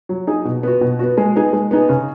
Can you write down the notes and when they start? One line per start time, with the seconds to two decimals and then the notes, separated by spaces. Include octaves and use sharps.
0.09 F#3
0.27 D#4 G#4
0.45 B2
0.63 B3 F#4
0.81 B2
0.99 B3 F#4
1.18 G#3
1.36 B3 D#4 G#4
1.53 G#3
1.71 B3 D#4 G#4
1.89 C#3